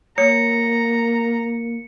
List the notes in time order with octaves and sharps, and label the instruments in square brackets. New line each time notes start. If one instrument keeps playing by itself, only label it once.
[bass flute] A#3 [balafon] C#5 [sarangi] A#5 [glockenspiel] C#7